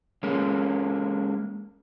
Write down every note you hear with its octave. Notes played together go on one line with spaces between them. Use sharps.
G#3 A#3 C#4